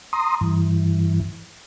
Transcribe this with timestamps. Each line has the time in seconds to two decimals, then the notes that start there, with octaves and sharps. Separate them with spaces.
0.13 A#5 C6 D#6
0.41 G2 E3